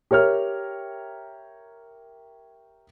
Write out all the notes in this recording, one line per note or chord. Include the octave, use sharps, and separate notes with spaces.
G4 A#4 C#5 E5 F6